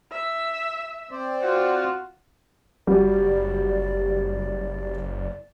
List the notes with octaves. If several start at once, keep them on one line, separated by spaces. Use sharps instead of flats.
E5
C4 C5 D5
F4 F#4
F#1 G3 F#4 D5